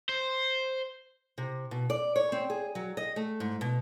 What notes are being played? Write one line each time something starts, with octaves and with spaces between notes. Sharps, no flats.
C5
C3
B2
D5
C#5
C4
G#4
F#3
D#5
A3
G#2
B2